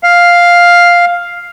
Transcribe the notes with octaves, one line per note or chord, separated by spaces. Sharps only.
F5